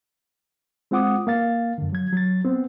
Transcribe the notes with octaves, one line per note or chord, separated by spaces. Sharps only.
G#3 C4 F4 F#5 D6 D#6
A#3 F5 A6
F#2 D3
F#3 G#6
F#3 A6
B3 C4